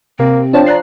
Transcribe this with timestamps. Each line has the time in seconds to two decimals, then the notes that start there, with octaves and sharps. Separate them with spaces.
0.19 C3 A#3 C4
0.53 F3 D4 C#5 G5 A5
0.66 D5 A#5 F#6 C7